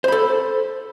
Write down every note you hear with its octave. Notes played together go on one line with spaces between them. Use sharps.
A4 C5 B5